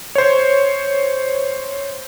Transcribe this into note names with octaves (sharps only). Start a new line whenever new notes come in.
C5 C#5